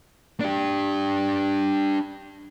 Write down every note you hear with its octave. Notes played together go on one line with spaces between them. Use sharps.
D4 G4